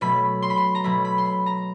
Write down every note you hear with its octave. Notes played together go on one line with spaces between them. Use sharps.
B2 F#3 A3 B5
C6
B5
C6
A#5
B2 F#3 A3 B5
B5
C6
B5
A#5